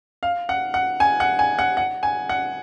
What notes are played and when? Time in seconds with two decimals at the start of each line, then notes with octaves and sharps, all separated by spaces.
0.23 F5
0.49 F#5
0.74 F#5
1.00 G#5
1.20 F#5
1.39 G#5
1.59 F#5
1.77 F#5
2.03 G#5
2.29 F#5